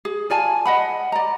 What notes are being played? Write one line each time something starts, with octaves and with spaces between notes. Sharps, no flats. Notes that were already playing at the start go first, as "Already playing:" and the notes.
G#4
F4 D5 G#5 A5
D#5 F#5 B5
D5 A#5